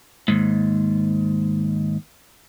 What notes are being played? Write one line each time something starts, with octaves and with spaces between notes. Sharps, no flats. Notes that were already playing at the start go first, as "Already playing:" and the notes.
D#2 G#2